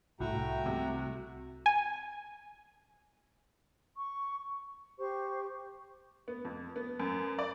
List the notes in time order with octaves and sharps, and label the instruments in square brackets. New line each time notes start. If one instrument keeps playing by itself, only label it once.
[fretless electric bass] C2 [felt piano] A2 [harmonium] A3 G5 A#5 [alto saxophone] F#4
[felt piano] C3
[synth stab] G#5
[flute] C#6
[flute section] G4 C5 C#6
[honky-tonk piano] B3
F2
B3
F#2
D5